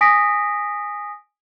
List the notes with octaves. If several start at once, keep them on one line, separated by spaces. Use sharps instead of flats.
G#5 D#6 A#6 B6 D7